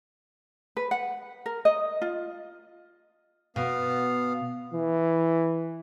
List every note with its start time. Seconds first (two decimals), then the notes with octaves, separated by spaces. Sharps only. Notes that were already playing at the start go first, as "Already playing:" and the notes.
0.77 B4
0.91 F#5
1.46 A#4
1.65 D#5
2.02 F4
3.56 B2 B3 F5
4.74 E3